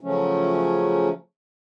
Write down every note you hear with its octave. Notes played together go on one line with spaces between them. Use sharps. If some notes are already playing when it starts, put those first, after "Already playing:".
C#3 F3 F#3 A3 C#4